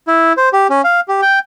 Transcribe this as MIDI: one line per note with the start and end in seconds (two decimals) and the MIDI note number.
0.08 0.33 64
0.37 0.49 72
0.53 0.67 67
0.70 0.82 61
0.84 1.00 77
1.08 1.21 67
1.22 1.39 79